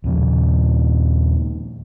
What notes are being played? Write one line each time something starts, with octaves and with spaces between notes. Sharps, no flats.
D#2 A#2 F3